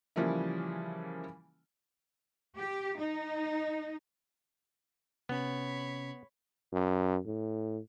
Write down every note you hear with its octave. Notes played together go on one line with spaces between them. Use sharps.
C#3 E3 F3 G3 A#3 E4
G4
D#4
C3 B3 C#4 C#5 B5
F#2
A2